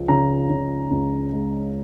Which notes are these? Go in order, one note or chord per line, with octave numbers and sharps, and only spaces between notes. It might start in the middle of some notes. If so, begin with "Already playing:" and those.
Already playing: C#2 F3
C#3 A#5
C#3
C#2
G#3